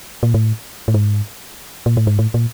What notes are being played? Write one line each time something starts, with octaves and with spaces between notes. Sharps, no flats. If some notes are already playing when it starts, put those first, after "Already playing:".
A#2
A2
A2
G#2
A#2
A2
G#2
A2
A#2